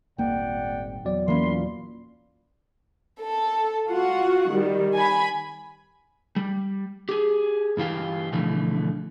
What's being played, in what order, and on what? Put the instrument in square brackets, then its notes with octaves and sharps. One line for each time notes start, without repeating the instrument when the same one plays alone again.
[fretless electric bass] D#1 A#3 [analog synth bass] G#1 [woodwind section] D5 F#5 G5
[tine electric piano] E2 F#3 D5
[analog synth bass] A#2 [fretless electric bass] E3 A#3 C#4 [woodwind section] F5 B5 C6
[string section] A4
F4 F#4 F#5
D#3 G3
G#5 B5
[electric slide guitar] G3
G4 G#4
G2 E3 F4 G4
B2 D3 E3 F3 A3